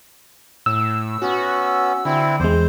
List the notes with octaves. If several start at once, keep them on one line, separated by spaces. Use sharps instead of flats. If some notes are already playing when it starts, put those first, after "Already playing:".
A2 E6
B3 C#4 F#4
D3 C4 E4
E2 G#3 C5